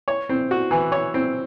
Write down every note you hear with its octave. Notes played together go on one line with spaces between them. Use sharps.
C#5
C4
F#4
E3
C#5
C4